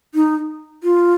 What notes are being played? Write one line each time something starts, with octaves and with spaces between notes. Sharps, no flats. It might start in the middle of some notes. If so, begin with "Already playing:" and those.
D#4
F4